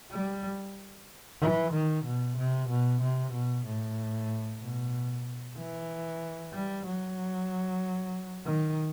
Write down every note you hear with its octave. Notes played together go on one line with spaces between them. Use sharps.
G3
E3
D#3
B2
C3
B2
C3
B2
A2
B2
E3
G3
F#3
D#3